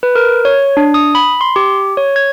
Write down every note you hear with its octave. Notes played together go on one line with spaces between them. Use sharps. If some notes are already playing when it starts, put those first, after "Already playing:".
B4
A#4
C#5
D4
D#6
B5
C6
G4
C#5
G#6